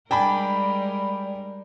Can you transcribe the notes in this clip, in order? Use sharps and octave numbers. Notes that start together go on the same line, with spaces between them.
G3 G#3 D4 A#4 D5 G5 G#5 B5